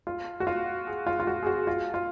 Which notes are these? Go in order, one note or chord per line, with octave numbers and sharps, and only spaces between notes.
F4
F#4
F4
G#4
F4
F4
F#4
G#4
F#4
F4
F4